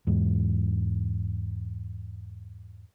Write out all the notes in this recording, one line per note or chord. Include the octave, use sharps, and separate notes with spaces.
E2 G#2